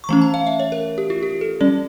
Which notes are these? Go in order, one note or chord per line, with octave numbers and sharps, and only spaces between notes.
C#6
E3 A3 C#4 A#5
A5
F5
E5
C#5
A#4
G4
F4
G4
A4
G3 C#4 D5